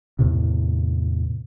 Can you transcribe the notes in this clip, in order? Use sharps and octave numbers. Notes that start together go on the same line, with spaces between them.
E2 A2 C3